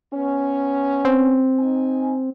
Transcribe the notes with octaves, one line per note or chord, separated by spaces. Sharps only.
B3 C#4
C4
D#4 G#5